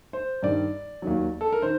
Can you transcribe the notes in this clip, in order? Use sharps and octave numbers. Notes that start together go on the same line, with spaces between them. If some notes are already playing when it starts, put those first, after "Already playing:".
C5
G2 D#3 G3 D5
D#2 D#3 F#3
A4
A#4
D#3 C5